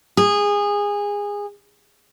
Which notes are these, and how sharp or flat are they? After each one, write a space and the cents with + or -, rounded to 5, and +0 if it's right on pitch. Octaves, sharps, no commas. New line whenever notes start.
G#4 -20